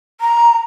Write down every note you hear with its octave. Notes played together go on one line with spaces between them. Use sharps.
A#5